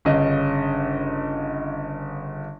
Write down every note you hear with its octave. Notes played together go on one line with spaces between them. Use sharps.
G1 C#3 D#5